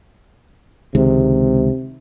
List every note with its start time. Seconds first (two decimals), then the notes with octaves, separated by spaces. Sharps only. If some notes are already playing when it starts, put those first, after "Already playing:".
0.95 C#2 C3 D#3 G#3